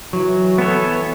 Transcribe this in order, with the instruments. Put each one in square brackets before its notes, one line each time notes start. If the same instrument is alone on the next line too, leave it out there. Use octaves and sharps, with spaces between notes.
[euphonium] E3 [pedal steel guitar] F#3
[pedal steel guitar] B3 A4 C#5